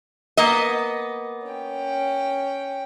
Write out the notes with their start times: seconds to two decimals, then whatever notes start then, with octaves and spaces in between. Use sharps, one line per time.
0.37 A#3 B3 D#5
1.48 C#4 G5